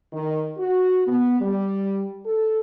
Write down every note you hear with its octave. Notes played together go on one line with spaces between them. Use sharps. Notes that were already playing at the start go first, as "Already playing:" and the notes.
D#3
F#4
B3
G3
A4